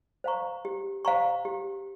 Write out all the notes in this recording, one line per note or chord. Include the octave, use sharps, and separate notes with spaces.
C5 F5 A#5 C#6
G4
C5 F5 A#5 C#6
G4